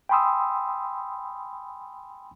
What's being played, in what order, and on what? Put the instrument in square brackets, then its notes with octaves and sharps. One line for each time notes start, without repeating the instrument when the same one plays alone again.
[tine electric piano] G5 G#5 B5 C6 D#6 E6